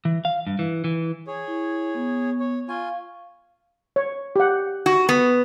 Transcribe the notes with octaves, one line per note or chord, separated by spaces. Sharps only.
E3
F5
G2
E3
E3
G#4 C#5
E4
B3
C#5
F4 F5 G#5 C#6
C#5
G4 F#5
F#4
B3